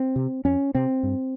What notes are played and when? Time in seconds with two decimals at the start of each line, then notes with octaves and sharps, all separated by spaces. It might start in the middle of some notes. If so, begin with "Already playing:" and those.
Already playing: C4
0.16 C3
0.45 F2 C#4
0.75 C3 C4
1.03 G2